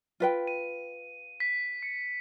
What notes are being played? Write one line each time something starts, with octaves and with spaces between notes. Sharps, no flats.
F4 B4 G5
D#7
B6
C#7